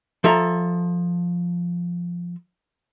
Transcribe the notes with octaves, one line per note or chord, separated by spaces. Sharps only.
F3 A4 E5 A#5